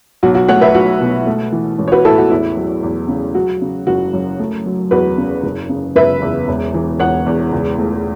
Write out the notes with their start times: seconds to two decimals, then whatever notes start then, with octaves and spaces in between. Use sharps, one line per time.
0.23 B1 F#4
0.35 F#4
0.49 A3 C#5 F#5
0.61 B4 E5
0.74 B1 F#4
1.00 B2
1.27 A3
1.52 E3
1.79 A1
1.88 C#5
1.92 F#4 B4
2.05 A2 E4 A4
2.18 F#4
2.30 E2 E4
2.57 F#3
2.83 E2
3.09 C#3
3.35 F#3 F#4
3.62 C#3
3.87 F#1 F#4
4.13 F#2
4.39 A3
4.66 F#3
4.91 E2 F#4 B4
5.18 C#3
5.43 F#1
5.69 C#3
5.96 F#1 B4 E5
6.22 E2
6.48 E1
6.74 E3
6.99 E1 C#5 F#5
7.26 E2
7.52 C#2
7.78 A3